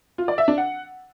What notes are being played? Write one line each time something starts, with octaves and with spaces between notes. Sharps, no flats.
F4
D5
E5
D4
F#5